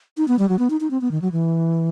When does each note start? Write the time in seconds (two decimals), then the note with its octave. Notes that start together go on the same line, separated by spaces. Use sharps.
0.17 D#4
0.28 B3
0.39 G3
0.49 F#3
0.59 B3
0.70 D#4
0.80 D#4
0.91 C4
1.01 B3
1.11 D#3
1.22 F#3
1.32 E3